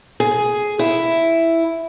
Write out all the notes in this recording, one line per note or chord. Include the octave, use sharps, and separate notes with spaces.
G#4
E4